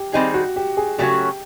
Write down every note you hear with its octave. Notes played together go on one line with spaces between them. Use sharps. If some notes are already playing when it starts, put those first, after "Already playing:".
Already playing: G4
D#3 G3 C4 D#4 G4 G#4
F#4
G4
G#4
C#3 F#3 A3 C#4 F#4 G4